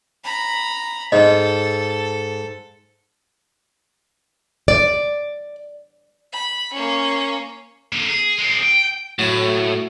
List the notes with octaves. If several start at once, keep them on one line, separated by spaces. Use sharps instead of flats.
A#5 B5
G#2 A4 D#5
D5
B5
A#3 C#4
A#2 D3
G#4
G#3 C4
G5
A2 F#3 F#4